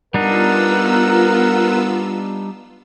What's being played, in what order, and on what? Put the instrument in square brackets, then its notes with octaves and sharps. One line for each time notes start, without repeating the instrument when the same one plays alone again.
[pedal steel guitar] G3 D4 D#4 [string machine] B3 F4 E6 [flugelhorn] A#4 [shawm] F#5